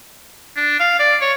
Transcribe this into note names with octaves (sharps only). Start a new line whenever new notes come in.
D4
F5
D5
C#5